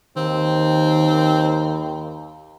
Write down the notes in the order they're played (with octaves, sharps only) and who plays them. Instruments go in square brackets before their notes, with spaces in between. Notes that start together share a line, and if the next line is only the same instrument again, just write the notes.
[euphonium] D#2 [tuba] D#3 [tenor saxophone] C4